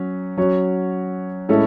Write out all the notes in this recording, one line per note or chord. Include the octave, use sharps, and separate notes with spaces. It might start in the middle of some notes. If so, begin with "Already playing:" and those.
Already playing: F#3 C#4
F#3 C#4 F#4 C#5
A2 G#3 C#4 E4 A4